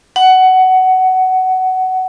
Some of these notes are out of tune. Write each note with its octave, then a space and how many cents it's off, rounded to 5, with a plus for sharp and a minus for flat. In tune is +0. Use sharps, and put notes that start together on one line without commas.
F#5 +15